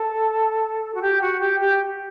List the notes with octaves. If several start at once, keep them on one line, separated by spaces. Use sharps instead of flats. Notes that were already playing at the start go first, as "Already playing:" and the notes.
Already playing: A4
F#4
G4
F#4
G4
G4